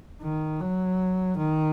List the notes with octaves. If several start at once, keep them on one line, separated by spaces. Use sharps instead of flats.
D#3
F#3
D#3